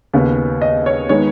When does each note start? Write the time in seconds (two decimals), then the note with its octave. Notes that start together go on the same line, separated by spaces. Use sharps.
0.13 D#2 C#3 B3
0.62 D#5
0.86 C#5
1.09 D#3 G#3 B3 C#5